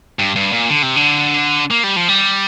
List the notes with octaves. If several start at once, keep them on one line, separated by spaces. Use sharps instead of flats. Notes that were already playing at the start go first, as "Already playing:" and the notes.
G2
G2
A#2
D3
C3
D3
A#3
G3
F3
G3